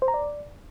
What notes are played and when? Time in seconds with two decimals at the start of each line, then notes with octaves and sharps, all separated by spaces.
0.02 C5
0.08 A#5
0.14 D5